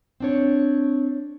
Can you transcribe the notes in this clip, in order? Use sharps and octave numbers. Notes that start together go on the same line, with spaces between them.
C4 D4 C#5